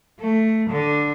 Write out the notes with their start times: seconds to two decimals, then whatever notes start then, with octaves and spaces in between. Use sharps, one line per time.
0.20 A3
0.71 D3